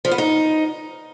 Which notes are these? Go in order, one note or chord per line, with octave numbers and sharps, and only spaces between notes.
F3
B3
D#4